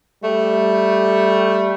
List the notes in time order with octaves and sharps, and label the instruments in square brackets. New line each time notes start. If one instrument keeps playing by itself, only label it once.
[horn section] G3 A3